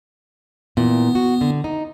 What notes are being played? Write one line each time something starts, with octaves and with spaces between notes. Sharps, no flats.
A#2 E3 B3
F#4
D3
D#4